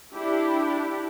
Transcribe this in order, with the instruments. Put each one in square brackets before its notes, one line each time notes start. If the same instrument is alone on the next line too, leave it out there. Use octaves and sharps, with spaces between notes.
[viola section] D4 E4 G4